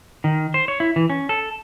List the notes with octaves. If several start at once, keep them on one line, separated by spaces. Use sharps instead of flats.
D#3
C5
C#5
E4
E3
C#4
A4